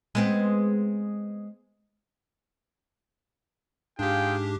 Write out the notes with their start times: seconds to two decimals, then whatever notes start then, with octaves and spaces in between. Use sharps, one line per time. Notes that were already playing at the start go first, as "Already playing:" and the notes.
0.15 G#3 B3 C4
3.99 G#2 D4 F4 G4 G#4 G5